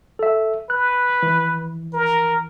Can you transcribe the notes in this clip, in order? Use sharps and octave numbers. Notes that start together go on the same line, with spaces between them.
A4 E5
B4 F#6
E3
A#4